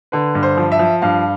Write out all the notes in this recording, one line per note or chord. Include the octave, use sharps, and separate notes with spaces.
D3 B4
G2
C5
F3
E5
F3
G2 F5